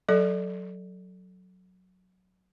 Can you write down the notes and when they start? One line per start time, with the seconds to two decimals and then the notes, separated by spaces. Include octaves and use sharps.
0.09 F#3 A4 D5